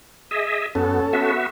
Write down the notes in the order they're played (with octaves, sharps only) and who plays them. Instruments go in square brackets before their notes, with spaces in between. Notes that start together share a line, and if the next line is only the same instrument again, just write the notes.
[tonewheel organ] G#4 D#5 E5
[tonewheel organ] F#2 B3 [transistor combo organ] C#4 A4
[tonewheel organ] B3 F#4 E5